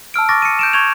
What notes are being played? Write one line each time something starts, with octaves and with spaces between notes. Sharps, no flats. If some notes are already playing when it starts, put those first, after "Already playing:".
A5 E6 F6 D7
C#6 D6 F6 A6 A#6
C#7 D#7
G6 D7 E7
C#6 G6 G#6 F7